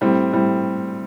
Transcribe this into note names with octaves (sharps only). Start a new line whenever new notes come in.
A2 G3 C4
A2 G3 C4